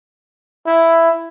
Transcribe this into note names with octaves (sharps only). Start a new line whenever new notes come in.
E4